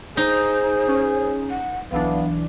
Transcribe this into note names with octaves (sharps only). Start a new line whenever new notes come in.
D#4 G#4 C5
C#4
F#5
B1 E3 B3 D4 F5